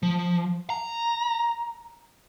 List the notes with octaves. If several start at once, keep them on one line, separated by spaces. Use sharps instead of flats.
F3
A#5